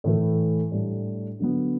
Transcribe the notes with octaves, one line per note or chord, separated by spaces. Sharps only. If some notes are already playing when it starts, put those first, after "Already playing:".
A2 E3 A3
A2 G3 D4
D3 F#3 B3